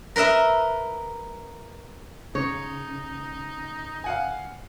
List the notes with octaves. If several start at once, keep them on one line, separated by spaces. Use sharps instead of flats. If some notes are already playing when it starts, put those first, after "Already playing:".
A#4 B4 D#5 E5
C#3 D#4 C#5
F5 F#5 G#5